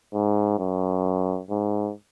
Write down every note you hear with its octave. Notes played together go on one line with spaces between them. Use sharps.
G#2
F#2
G#2